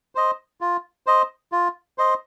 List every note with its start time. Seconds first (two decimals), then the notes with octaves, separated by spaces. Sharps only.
0.15 C5 D#5
0.61 F4
1.07 C5 D#5
1.52 F4
1.98 C5 D#5